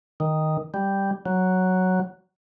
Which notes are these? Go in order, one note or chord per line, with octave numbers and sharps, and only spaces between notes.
D#3
G3
F#3